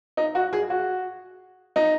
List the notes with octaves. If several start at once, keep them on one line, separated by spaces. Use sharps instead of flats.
D#4
F#4
G#4
F#4
D#4